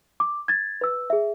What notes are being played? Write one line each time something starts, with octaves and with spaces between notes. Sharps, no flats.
D6
G#6 A6
B4 E6
G#4 E5